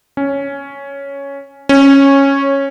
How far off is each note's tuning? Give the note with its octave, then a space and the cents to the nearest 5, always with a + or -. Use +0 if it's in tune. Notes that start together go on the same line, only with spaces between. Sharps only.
C#4 +5
C#4 -10